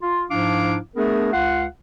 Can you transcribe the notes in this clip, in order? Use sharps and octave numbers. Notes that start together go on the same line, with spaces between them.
F4
G#2 F3 D4 E4 F5 D6
A3 B3 D4 G#4 A#4
C#2 F4 F5 F#5